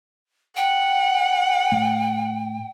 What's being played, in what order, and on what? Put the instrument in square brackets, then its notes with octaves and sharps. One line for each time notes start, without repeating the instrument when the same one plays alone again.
[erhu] F#5 [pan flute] G5
[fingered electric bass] A2 A3